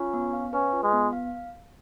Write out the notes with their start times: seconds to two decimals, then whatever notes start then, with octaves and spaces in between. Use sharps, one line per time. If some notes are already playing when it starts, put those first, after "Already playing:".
Already playing: C#4 F4
0.14 B3
0.33 F5
0.53 C#4 B4
0.73 F4
0.83 G#3
0.93 B3
1.13 F5